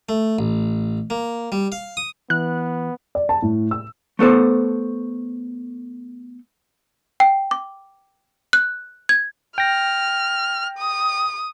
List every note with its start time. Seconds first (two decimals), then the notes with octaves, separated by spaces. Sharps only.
0.09 A3
0.39 A1
1.10 A#3
1.52 G3
1.72 F5
1.97 D#6
2.30 E3 B3 F#6
3.15 D5
3.29 A5
3.42 A2
3.71 E6
4.19 A3 B3 A4 C5
7.20 G5
7.51 D6
8.53 F#6
9.09 G#6
9.58 G5 F6 A#6
10.78 D#6